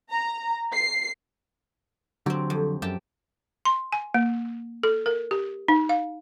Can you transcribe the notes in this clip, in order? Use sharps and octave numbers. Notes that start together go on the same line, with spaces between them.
A#5
C7
D3 F#3 C4 G4
F2
F#2 G4 G5 A5
C6
G#5
A#3
A4
A#4
G4
D#4
F5